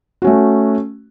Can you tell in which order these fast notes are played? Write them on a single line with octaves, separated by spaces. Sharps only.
F#4 C#4 A3